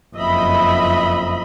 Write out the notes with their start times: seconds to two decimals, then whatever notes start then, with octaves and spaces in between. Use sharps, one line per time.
0.16 F#1 F2 D#5 E5 B5